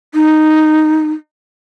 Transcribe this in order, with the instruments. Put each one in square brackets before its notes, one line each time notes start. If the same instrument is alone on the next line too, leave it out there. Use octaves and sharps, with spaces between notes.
[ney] D#4